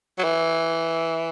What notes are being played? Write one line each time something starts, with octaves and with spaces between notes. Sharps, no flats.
F#3
E3